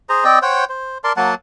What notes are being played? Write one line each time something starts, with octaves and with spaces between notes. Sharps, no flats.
G#4 C5 A#5
C4 D5 D#5 G5
C5 C#5 F#5 G5
C5
A#4 D5 A5 C6
F#3 A#3 F#5 A5